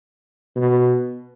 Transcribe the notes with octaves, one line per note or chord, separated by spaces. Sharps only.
B2